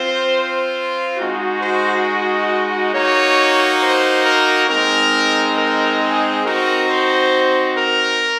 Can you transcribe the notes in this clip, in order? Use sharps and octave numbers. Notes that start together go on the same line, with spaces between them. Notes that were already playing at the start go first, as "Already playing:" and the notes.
Already playing: C4 F4 C5
G#3 D#4 F#4
C5
D#5
A#3 D#4 F#4 C#5
C5
A#4
G#3 C4 D#4 A#4
A#4
G#4
C4 D#4 F#4 A#4
C5
A#4